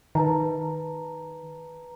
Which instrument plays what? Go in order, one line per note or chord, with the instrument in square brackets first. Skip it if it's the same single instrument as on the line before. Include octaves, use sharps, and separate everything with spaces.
[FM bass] D#3 [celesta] B4 A5 A#5